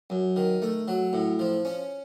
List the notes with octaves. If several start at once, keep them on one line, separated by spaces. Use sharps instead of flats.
F#2
D#3
A3
F#3
A2
F3
C#4